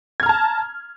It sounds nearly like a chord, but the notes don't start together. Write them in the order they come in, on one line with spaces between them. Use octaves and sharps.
G#6 F6 A#5 A5